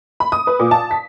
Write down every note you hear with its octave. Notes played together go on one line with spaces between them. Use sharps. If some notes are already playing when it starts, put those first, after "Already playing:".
B5
D#6
B4
A#2
A5
B6